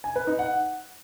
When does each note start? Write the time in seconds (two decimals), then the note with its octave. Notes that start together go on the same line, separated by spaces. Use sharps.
0.04 G#5
0.16 B4
0.27 D#4
0.39 F#5